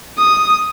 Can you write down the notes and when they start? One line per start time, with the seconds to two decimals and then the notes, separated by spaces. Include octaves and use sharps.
0.18 D#6